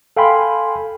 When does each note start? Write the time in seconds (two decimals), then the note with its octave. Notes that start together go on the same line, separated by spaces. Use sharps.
0.17 A4 F5 G5 G#5 B5 C6